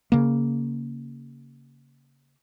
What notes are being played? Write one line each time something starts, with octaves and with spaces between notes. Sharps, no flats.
C#3 A#3